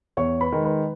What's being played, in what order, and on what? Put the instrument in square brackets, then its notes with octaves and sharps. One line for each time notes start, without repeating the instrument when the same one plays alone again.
[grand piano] E2 C#5 C#6
B4 B5
D#3 G#3
B4 B5